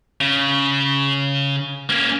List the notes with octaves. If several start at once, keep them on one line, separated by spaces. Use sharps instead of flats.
C#3
A#3 C#4